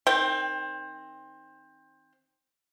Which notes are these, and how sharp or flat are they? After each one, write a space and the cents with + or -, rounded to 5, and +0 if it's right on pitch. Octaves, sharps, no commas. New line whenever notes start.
D#3 +0 C4 +20 G5 +0